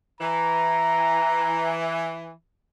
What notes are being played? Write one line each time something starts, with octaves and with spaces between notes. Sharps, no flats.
E3 A#5